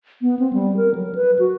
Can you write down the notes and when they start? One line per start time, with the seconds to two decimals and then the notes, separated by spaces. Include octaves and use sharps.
0.22 B3
0.39 C4
0.53 G3
0.77 A#4
0.95 F#3
1.15 B4
1.39 F#4